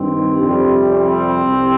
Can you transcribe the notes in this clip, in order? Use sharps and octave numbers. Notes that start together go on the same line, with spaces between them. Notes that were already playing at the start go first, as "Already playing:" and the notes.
Already playing: G2 D#3 G3 C4
F2 C3 G3
C4
C2 C3